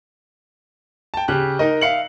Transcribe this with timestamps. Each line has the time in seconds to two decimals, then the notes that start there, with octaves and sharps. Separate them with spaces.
1.14 G5 A5
1.28 C#3 G4 F#6
1.59 D#4 A#4 D#5
1.81 E5 F5 C#7 F#7